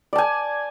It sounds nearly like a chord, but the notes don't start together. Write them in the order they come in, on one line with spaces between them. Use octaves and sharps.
D5 A5 G#5